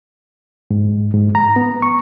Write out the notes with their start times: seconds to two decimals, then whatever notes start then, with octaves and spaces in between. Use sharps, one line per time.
0.71 G#2
1.14 G#2
1.35 A#5
1.56 B3
1.82 C#6